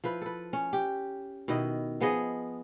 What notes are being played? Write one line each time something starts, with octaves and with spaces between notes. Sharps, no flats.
F3 E4 B4
A4 B4
C#4
G4
B2 D#3 E4 D#5
F3 B3 G#4 D#5